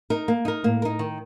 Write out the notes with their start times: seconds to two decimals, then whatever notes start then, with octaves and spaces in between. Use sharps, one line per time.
0.10 D#4 A#4
0.28 A#3
0.45 D#4 A#4
0.64 A2 A#3
0.82 D#4 A#4
0.99 D#3